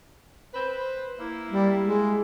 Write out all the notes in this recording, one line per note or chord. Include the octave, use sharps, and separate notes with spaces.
B4 C5
A#3 E4
G3
G#3